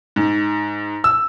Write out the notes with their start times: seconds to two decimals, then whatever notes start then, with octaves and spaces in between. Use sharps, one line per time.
0.16 G#2
1.04 E6